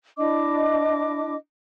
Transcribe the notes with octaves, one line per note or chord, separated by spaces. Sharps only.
D4 E4 D#5 D6